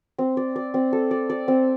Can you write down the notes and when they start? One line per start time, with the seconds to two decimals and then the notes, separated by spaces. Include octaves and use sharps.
0.18 C4
0.37 D5
0.56 D5
0.74 C4
0.93 A4
1.11 D5
1.30 D5
1.48 C4